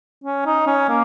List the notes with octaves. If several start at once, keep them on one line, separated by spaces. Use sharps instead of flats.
C#4
D#4
C#4
A#3